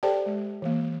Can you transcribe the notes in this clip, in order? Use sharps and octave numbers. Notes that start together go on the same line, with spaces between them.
G4 A4 C5 D5 G5 A5
G#3
E3 A#3